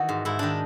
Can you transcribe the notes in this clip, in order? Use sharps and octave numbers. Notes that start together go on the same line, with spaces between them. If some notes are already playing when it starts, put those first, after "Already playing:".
Already playing: D#3 E3 F#4
G#2
G#2 E4
D#3 D4